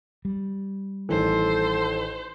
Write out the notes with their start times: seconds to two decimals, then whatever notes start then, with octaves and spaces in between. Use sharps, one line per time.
0.25 G3
1.09 A1 D#3 E3 A4 C5